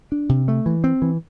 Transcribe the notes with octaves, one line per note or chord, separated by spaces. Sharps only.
D4
C3
A3
E3
C4
E3